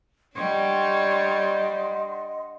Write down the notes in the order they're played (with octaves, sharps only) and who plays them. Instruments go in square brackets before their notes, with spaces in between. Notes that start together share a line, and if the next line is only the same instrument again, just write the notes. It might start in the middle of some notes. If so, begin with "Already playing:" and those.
[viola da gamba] G3 D4 [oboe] C#5 [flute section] D#5 F#5 C6